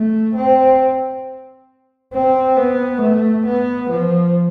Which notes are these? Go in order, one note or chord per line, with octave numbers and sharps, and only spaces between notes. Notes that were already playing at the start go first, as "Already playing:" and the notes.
Already playing: A3
C4
C4
B3
A3
B3
F3